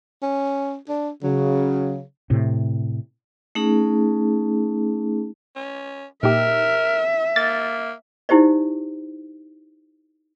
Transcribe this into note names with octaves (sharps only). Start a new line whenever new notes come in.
C#4
D4
C#3 F#3
A2 C3
A3 C#4 D#4 G#4
C#4
A#2 D#4 G4 A#4 E5
A#3 A6
D#4 E4 G4 C5 D5